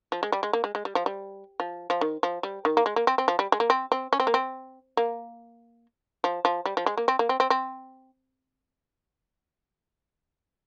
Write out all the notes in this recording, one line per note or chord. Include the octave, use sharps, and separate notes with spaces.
F3
G#3
G3
G#3
A#3
G#3
G#3
G3
F3
G3
F3
F3
D#3
F3
G3
D#3
A#3
G#3
A#3
C4
C4
F3
G3
G#3
A#3
C4
C4
C#4
C4
A#3
C4
A#3
F3
F3
G3
F3
G#3
A#3
C4
A#3
C4
C4
C4